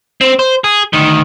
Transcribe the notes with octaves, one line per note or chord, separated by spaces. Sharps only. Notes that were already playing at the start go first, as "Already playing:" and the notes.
C4
C5
G#4
D2 D#3